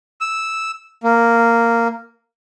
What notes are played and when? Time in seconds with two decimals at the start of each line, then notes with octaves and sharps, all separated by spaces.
0.21 E6
1.04 A#3